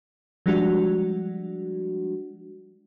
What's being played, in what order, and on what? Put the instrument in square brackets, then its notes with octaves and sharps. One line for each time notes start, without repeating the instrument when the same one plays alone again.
[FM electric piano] F3 G3 G#3 D4 F#4